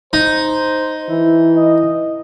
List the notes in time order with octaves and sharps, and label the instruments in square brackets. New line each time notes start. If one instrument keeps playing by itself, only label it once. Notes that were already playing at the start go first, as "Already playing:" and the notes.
[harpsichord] D#4 [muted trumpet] C5
[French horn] E3 [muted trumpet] E4
[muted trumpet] D#5